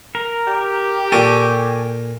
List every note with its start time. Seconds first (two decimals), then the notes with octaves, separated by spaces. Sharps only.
0.15 A#4
0.48 G4
1.12 A#2 A4 A#4 G#5 C#6